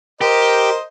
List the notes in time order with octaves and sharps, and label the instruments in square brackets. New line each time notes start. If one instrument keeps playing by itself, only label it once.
[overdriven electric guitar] G4 [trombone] A#4 [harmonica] C5 D#5